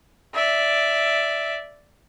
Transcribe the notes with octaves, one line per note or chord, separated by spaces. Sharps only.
D5 E5